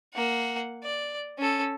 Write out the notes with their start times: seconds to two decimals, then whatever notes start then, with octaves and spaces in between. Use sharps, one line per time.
0.14 A#3 F#5
0.84 D5
1.38 C#4 A4